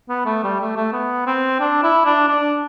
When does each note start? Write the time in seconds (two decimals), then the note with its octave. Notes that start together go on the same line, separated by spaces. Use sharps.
0.09 B3
0.25 A3
0.43 G3
0.60 A3
0.76 A3
0.93 B3
1.26 C4
1.60 D4
1.83 E4
2.05 D4
2.28 D4